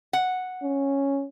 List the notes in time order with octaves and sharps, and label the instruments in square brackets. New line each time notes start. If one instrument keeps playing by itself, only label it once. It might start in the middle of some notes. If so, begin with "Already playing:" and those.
[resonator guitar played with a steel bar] F#5
[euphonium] C#4